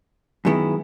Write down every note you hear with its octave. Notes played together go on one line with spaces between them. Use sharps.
F#2 D#3 G#3 B3 E4